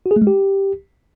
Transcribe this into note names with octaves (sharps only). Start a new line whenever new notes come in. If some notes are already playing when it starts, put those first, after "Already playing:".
F#4
G#4
A3
G#3
G4